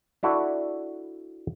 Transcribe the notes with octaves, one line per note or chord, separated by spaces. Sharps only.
D4 E4 F#4 A4 D5